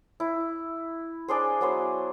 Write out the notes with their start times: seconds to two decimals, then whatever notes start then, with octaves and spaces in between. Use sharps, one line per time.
0.20 E4
1.28 D4 G#4 C5
1.61 F#3 B3 C5